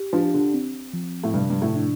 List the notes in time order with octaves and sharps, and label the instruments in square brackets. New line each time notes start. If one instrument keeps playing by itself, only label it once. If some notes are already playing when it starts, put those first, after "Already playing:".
Already playing: [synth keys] G4
[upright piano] F3 [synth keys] D4
[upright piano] D3
[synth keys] C4
F3
[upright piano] A2
[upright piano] G2 [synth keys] C3
[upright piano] G2
A2
[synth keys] D4